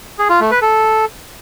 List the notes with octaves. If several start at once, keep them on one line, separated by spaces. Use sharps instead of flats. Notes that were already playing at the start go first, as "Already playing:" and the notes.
G#4
F4
A3
B4
A4